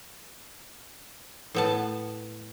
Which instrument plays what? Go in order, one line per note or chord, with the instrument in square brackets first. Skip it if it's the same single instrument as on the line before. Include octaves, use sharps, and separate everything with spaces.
[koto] A2 B3 A5